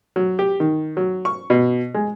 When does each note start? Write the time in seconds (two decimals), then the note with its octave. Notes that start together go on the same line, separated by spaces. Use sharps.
0.16 F#3
0.39 G4
0.60 D#3
0.97 F#3
1.25 C#6
1.50 B2
1.94 G#3